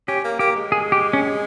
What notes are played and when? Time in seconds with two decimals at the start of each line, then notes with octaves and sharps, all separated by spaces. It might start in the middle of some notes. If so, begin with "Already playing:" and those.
0.08 C#4 G4
0.24 A#3
0.39 A#3 G4
0.56 G#3
0.72 G#4
0.92 G4
1.13 C#4